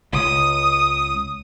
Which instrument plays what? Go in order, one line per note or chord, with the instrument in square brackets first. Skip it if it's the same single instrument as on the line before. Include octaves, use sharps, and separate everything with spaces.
[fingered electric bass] C#2 [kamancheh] D#6